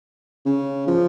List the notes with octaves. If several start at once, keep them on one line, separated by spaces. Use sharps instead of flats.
C#3
F3